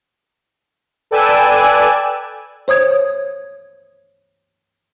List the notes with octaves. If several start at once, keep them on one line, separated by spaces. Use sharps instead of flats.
A4 B4 D5 G5 G#5 E6
C5 C#5 D#6 G#6